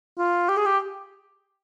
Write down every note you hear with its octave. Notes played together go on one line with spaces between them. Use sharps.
F4
G4
G#4
G4